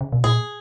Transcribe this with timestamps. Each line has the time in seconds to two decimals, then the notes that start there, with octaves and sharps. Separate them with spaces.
0.01 C#3
0.12 B2
0.24 A#2 G#4